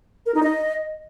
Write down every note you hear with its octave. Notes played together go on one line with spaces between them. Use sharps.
A#4
D#4
D#5